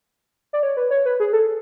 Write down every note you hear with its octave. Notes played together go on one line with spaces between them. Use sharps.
D5
C#5
B4
C#5
B4
G#4
A4